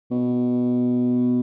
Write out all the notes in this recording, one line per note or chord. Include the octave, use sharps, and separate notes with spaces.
B2